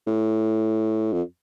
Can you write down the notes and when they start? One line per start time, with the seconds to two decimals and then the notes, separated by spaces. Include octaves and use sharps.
0.07 A2
1.13 F2